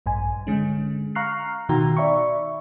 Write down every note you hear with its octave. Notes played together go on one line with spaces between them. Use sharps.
A#1 G2 G#5
D3 G#3 C#4
F5 A#5 C#6 F6 F#6 C7
B2 D#3 F#4 G5 A#5
D5 E5 B5 C#6